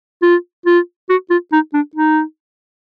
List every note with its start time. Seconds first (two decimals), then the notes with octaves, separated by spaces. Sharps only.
0.22 F4
0.66 F4
1.09 F#4
1.30 F4
1.52 D#4
1.74 D4
1.95 D#4